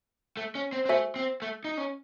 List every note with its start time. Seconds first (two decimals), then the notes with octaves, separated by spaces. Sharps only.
0.37 A3
0.55 C#4
0.73 C4
0.85 C4
0.89 A3 F#4 C5 E5 G#5
1.16 C4
1.42 A3
1.65 D#4
1.77 C#4